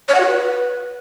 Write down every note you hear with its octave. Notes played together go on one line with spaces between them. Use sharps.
C#5
F#5
F#4
B4